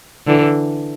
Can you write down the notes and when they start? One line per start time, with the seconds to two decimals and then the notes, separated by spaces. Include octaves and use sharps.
0.27 D3 E3